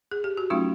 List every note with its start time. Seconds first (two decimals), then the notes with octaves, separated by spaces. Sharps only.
0.11 G#4
0.24 G4
0.37 F#4
0.50 F#3 A3 C#4 D#4 F4